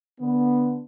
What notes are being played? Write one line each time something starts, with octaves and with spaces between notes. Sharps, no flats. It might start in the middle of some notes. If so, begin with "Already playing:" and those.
D3 B3